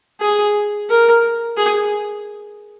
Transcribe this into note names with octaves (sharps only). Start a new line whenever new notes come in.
G#4
A#4
G#4